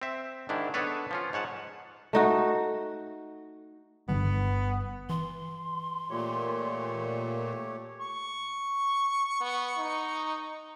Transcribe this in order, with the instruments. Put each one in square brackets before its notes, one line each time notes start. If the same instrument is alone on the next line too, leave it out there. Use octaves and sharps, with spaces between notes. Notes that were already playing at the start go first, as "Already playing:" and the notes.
[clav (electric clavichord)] C4 E5
G#2 D#3 D4 E4
B3 D4 A4 B4 C#5
F3 C#4 F4
G#2 C#5 F#5 A5
[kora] A3 D#4 F#4
[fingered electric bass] G1 D3 G3 [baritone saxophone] B3
[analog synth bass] E3 [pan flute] C6
[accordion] A#2 [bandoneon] A3 G4 C#5
[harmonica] C#6
[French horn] B3
D#4